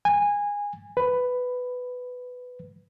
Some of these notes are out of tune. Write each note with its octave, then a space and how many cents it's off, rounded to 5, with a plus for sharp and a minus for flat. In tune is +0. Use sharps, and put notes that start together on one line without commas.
G#5 -20
B4 +10